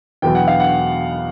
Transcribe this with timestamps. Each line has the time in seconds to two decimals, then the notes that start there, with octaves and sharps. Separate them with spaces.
0.22 E2 B2 F#3 B3 G5
0.35 F#5
0.47 F5
0.60 F#5